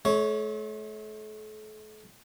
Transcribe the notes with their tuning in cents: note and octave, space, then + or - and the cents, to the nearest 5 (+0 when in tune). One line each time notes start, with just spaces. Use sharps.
A3 -40 C#5 +0